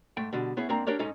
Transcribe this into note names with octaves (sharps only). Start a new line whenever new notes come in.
G#2 A3 G5
B2 D3 G3
B3 C#4 E4 G#4
G#2 A#3 C4 D4 A#5
D4 G4 A#4 C#5 D5
G#2 C#4 D#4 A4 D#5